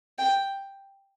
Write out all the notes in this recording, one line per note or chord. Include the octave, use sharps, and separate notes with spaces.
G5